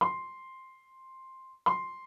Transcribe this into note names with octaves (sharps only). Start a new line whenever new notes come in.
C6
C6